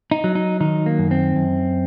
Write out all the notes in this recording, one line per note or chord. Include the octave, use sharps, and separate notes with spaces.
D#4
F#3
D#4
D#3 D#4
A#3
F#2
C4
F#2